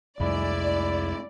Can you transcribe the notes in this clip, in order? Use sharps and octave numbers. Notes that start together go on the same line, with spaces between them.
C2 F2 G#3 A3 E4 D5